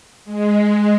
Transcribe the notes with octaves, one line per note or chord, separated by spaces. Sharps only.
G#3